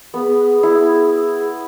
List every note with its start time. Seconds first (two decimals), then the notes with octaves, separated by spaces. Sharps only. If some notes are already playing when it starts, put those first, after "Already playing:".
0.14 B3 G#4
0.63 E4